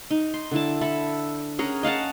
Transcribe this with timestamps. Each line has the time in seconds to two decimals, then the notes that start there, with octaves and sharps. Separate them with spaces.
0.11 D#4
0.34 C6
0.51 D3 E4 A5
0.81 A4 E5 B5
1.59 C#4 G#4 A#4 F#5
1.83 D#5 F5 F#5 A5